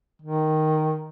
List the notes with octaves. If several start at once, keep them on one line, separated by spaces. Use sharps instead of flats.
D#3